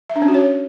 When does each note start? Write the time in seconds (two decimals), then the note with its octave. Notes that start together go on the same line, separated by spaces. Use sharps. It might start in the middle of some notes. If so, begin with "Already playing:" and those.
0.10 E5
0.16 D4
0.22 C#4
0.28 F#4
0.34 C#5